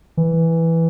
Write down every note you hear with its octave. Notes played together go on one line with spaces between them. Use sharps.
E3